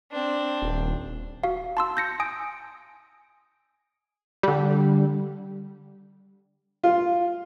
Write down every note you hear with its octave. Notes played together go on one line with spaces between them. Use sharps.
C4 D4
D#1
F#4 F5
A5 C6 E6
G6 A#6 C#7
G#5 D#6 D7
D3 G3
F4